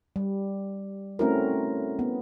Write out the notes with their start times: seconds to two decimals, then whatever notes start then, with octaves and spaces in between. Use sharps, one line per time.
0.16 G3
1.19 A3 C4 C#4 E4 F#4 A#4
1.99 B3